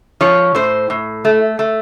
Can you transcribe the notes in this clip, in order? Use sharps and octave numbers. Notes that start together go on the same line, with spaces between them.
F3 C#5
A2 C5
A2
A3
A3